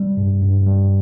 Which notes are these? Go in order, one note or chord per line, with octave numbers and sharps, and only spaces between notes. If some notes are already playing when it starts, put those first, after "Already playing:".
Already playing: G3
G2
G2
G3